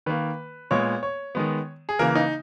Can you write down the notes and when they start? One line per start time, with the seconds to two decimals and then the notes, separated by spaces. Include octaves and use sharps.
0.06 D#3 A#3 B4
0.71 A#2 G#3 B3 C#5
1.03 C#5
1.35 D#3 G#3 B3
1.89 G#4
1.99 C#3 E3 A#3 A#4
2.15 D#4